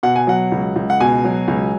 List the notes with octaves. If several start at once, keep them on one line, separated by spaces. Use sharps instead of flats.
B2 F#5
G#5
F#3 F#5
C#2
C#2
F#5
B2 G#5
F#3
C#2